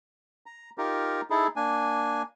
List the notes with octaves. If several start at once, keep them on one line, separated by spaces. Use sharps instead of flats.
A#5
D#4 F4 G4 A#4
D#4 E4 G#4 A4
A#3 D4 G#5